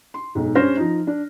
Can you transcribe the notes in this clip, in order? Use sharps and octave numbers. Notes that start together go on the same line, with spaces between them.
C6
B1 G#2
G2 C#4 C5 C#5 F6 A#6
F3 D#4
D4